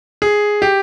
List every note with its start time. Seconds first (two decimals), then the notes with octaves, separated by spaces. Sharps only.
0.22 G#4
0.62 G4